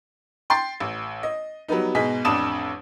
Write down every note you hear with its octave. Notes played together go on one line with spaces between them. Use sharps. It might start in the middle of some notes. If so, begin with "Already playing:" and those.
G5 C6 A6 C7
A1
D#5
F#3 G3 B3 D#4
G#2 B2 G#4 D#5 B6
A1 F2 D4 A5 D#6 E7